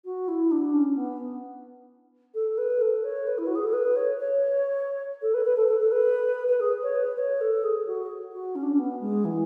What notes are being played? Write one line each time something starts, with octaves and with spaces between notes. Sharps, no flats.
F#4
E4
D4
C#4
B3
A4
B4
A4
C#5
B4
E4
F#4
G#4
A4
B4
C#5
C#5
A4
B4
B4
A4
A4
A4
B4
B4
G#4
C#5
B4
C#5
A4
G#4
F#4
F#4
C#4
D4
C#4
B3
G#3
E3